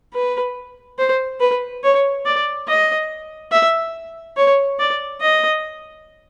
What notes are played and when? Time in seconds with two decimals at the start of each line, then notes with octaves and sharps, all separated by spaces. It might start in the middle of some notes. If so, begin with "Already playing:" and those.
0.13 B4
0.98 C5
1.40 B4
1.83 C#5
2.25 D5
2.68 D#5
3.52 E5
4.36 C#5
4.79 D5
5.21 D#5